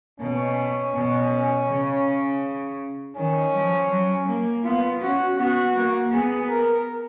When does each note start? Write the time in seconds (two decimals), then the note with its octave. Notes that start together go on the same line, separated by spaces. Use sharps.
0.20 B2 C#4
0.94 B2
1.68 C#3
3.16 D#3 C#4
3.53 F3
3.90 F#3
4.27 A#3
4.63 B3 F4
5.01 C#4 F#4
5.37 B3 F#4
5.75 A#3
6.12 B3 G#4
6.49 A#4